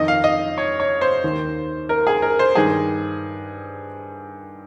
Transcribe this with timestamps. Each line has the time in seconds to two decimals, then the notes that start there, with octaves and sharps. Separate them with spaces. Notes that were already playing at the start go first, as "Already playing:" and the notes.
Already playing: F2 D#3 D#5
0.08 F5
0.24 D#5
0.58 C#5
0.80 C#5
1.01 C5
1.24 D#2 D#3
1.89 A#4
2.07 G#4
2.22 A#4
2.39 C5
2.55 G2 D#3 G#4